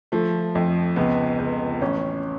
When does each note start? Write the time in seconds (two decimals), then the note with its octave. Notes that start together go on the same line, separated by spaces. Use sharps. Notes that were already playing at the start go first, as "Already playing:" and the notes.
0.12 F3 A3
0.55 F2
0.96 C#2 B3
1.38 C#2
1.81 A1 C#4